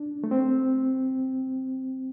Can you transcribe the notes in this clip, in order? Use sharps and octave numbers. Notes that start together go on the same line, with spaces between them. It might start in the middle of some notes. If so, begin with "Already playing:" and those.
Already playing: D4
A3
C4